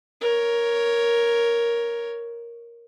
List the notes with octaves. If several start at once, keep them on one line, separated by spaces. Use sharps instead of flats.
A#4 C#5